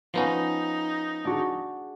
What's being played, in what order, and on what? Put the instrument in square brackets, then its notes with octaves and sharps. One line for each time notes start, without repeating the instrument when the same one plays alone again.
[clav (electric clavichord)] F3 B3 C#4 [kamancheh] D#4
[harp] D4 F#4 G#4